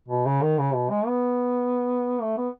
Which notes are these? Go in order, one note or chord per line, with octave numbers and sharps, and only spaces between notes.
B2
C#3
D#3
C#3
B2
G#3
B3
A3
B3